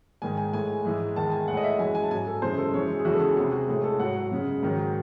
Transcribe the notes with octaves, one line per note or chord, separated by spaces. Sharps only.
G#2 D#3 G#3 G#5
G#5
A2 G#3 G#5
G#2 E3 G#3
E2 D#3 G#3 A5
G#5
A2 G#3 F#5
D#5
E5
F#2 E3 G#3 G#5
G#5
A5
G#2 F#3 G#5
A4
F#2 C#3 E3 G#3 C5
A4
F#2 E3 G#3 C#5
G#4
E2 C#3 E3 G#3 F#4
A4
G#4
C3 F#3 G#4
F#4
A2 G#3 G#4
A4
G#2 F#3 F#5
F#2 C#3 G#3
G#2 D#3 F#3